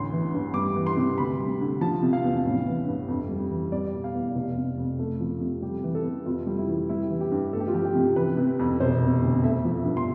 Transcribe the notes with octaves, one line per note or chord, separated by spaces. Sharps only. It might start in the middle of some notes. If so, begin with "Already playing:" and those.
Already playing: A1 D2 C6
E3
G2
G3 D6
E3
C6
C3
D2 B5
G3
D3
F3 A5
C3
F5
E2
A1
E3
G2
F2
G3
E3
G3 D5
B2
F5
E2
F1
C3
F2
A3
F3
C3
G3 G4
E3
A4
C3
F2 F4
G3
E4
E3
G3 E4
E3
G4
G2
A3 A4
G4
F4
F3 G4
G4
C3
E3 B4
C3
F2
E1 C5
C3
D2
A3 E5
F3
G2
C6